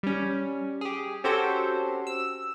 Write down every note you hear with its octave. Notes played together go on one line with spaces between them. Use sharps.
G3 C#4
G4 G#4
C4 C#4 F#4 G4 A4 C5
E6